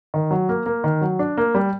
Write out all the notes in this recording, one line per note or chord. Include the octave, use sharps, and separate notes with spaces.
D#3
F#3
A#3
A#3
D#3
F#3
D4
A#3
G3